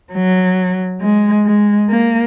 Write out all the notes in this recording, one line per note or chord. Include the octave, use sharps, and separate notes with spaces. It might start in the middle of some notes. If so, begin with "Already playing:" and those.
F#3
G#3
G#3
A#3